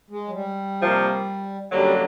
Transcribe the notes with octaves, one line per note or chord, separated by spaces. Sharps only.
G#3
F#3
G3
C3 F3 A#3
F#2 D3 F#3 G3 A#3 D4